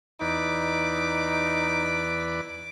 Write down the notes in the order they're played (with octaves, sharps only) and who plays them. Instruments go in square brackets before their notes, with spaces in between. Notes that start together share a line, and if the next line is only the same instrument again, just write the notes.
[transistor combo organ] E2 B4 D5 [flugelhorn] D#4 [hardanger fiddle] D6